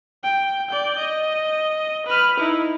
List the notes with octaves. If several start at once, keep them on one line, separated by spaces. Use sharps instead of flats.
G5
D5 G6
D#5
B4 F6
D#4 E4